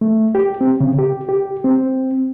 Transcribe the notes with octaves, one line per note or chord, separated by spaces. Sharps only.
A3
G4
C4
C#3
G4
G4
C4